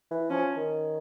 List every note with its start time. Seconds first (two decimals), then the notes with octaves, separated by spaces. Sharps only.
0.11 E3
0.30 F3 C#4
0.57 D#3